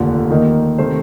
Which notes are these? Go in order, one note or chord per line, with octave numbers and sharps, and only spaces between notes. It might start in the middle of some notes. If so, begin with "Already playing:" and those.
Already playing: F1 D#2 D3
D#2 D#3 A#3 D#4
C3 D#3 A3 C5